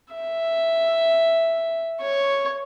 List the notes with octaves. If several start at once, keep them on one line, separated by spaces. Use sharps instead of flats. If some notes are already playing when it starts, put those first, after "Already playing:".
E5
C#5